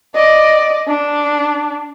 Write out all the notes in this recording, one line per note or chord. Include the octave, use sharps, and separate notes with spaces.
D5 D#5
D4